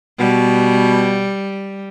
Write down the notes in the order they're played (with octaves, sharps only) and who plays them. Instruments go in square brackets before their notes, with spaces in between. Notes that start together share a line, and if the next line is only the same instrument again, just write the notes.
[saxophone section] B2 [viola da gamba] G3